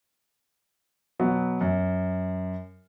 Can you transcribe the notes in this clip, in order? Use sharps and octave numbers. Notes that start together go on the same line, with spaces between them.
B2 F#3 B3
F#2